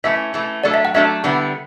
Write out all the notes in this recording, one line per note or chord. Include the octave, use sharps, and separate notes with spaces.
E3 A3 C#4 E5
E3 A3 C#4
F#3 A3 D4 A4 D5
E5
F#5
F#3 A3 D4 A4 E5
D3 G3 B3 E4